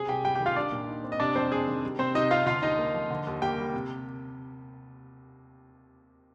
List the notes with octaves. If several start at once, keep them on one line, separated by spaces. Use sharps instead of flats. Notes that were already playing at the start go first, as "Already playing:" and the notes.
Already playing: C3 C4 G#4 G#5
C2 G4 G5
G3 G4 G5
G4 G5
D#3
F4 F5
G3 D4 D5
A#2
D#4
C4
D#5
C3 D4 D5
F2 C4 C5
F2 G#4
D#3
G3
C3 C4 C5
C3 D#4 D#5
C4 F4 F5
D3 F4 F5
D#2 D#4 D#5
A#3
F3
D3
D#2
A#3 G4 G5
G3
C3